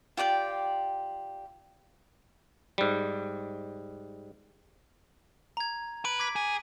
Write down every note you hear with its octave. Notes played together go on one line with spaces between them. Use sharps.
F4 G4 D5 G5
G#2 G3
A#5 G#6
B4 D7
D6 G#6 B6
G#4